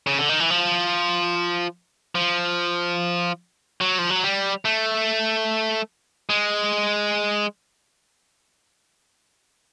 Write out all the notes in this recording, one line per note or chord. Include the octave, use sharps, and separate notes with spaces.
C#3
D3
D#3
E3
F3
F3
F#3
F3
F#3
G3
A3
G#3